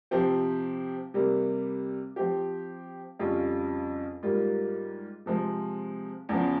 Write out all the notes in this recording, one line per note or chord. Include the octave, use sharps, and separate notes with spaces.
C3 F3 C4 G4
C3 G3 A#3
F3 C4 G4
F2 C#3 G3 C#4 F4
G#2 G3 A#3 F4
C3 F3 G#3 C4
E2 C#3 F3